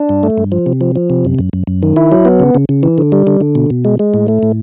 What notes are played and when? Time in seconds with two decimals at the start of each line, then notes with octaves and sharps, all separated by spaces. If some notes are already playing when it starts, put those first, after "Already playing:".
Already playing: D4
0.09 G2
0.23 A3
0.38 G2
0.52 F3
0.66 C3
0.81 F3
0.96 F3
1.10 C3
1.25 F#2
1.39 F#2
1.53 F#2
1.67 F#2
1.83 D#3
1.96 E4
2.12 F#3
2.25 B3
2.40 C#3
2.55 C#3
2.69 C#3
2.83 E3
2.98 D3
3.12 G3
3.27 D3
3.41 D3
3.55 B2
3.70 B2
3.85 G#3
3.99 G#3
4.14 A2
4.28 A3
4.43 A2